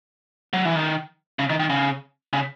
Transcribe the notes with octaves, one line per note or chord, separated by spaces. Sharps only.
F#3
E3
D#3
C#3
D#3
D#3
C#3
C#3